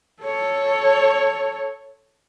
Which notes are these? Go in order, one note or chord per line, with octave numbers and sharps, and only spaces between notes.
A4 C#5